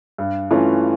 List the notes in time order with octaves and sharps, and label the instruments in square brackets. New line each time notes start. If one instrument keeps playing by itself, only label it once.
[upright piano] G2
E3 A3 C#4 F4